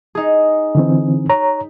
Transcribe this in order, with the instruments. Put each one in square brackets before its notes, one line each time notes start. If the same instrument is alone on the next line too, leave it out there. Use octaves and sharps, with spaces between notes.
[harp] D#4 G#4
[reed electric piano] D3 E3 C4
C#5 A#5